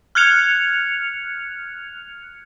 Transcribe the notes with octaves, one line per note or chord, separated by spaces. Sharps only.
F6 F#6 G#6 C#7 F7